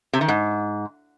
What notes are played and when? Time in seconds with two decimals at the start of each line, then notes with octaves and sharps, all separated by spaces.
0.13 C3
0.21 D#3
0.28 G#2